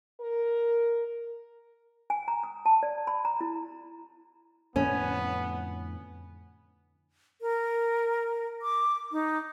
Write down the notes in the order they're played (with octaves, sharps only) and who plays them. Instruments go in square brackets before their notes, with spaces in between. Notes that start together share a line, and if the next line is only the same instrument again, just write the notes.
[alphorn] A#4
[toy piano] G#5
A#5
D#6
A5
D5
B5
A#5
E4
[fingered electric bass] F2 A2 D3 [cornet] B3 [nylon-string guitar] C#4
[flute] A#4
D6
D#4